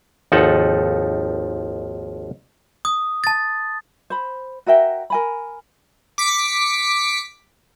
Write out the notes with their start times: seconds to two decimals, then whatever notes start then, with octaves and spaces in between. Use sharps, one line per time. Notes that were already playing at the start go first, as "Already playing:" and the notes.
0.32 G#1 D#2 F3 D#4 A4 F#5
2.85 D#6
3.24 A5 A6
4.10 C5 B5
4.66 F#4 A#4 E5 G5
5.10 A#4 G#5 B5
6.18 D6 B6 C#7